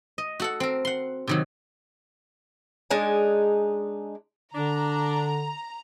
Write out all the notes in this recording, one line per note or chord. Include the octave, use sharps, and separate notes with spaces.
D#5
F#4 A4 F#5
C4 A#4
F#5 C6
C3 D#3 F#3
G#3 D4 D#4 G#5
D3 D4 A#5